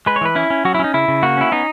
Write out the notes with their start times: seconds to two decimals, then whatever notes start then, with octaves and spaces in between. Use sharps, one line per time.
0.06 G#3 B4
0.16 C#5
0.21 E3 B4
0.35 C#4 E4
0.50 C#4
0.65 F#3 F#4
0.74 E4
0.79 C#4 D#4
0.94 C#3 E4
1.08 C#3
1.23 A#3 F#4
1.37 C#4 E4
1.52 B3 D#4